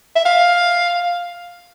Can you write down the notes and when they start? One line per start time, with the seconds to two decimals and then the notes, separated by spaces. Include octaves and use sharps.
0.15 E5
0.25 F5